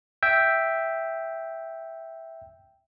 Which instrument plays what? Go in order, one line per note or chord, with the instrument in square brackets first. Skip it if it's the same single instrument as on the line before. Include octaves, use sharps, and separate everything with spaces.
[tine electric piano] E5 G5